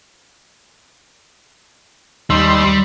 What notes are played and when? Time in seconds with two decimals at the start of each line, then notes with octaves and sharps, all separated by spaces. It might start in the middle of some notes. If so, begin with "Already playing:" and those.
2.30 D#2 G3 C6 E6